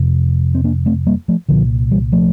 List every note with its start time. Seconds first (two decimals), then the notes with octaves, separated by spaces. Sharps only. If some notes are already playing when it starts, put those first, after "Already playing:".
Already playing: F2 C3
0.55 C4
0.64 A#3 D4
0.86 A3 C4
1.07 G3 A#3
1.28 F3 A3
1.49 C2 A#2 D3 F3
1.91 E3 G3
2.12 F3 A3